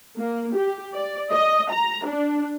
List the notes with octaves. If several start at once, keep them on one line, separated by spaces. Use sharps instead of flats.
A#3
G4
D5
D#5
A#5
D4